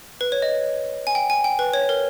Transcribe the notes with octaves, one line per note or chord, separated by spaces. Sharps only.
B4
C#5
D#5
G#5
G5
G#5
G5
B4
C#5
A#4